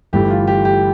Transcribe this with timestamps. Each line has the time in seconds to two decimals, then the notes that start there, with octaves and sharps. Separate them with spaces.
0.13 G1 G2 E3 A3 G4
0.30 F4
0.47 G4
0.65 G4